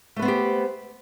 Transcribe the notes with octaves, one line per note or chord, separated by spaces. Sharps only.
A3 B3 G4 B4 C5